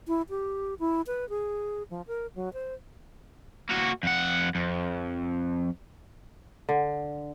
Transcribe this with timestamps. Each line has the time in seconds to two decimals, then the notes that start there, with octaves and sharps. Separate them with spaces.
0.08 E4
0.30 G4
0.79 E4
1.07 B4
1.29 G#4
1.90 F3
2.07 A#4
2.36 F#3
2.53 C5
3.69 A#3 F#4
4.03 F2 F#5
4.55 F2
6.69 D3